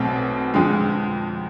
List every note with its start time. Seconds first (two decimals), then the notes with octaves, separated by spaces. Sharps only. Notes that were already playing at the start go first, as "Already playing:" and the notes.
Already playing: B1 B2 A3 C4
0.54 F2 D3 G#3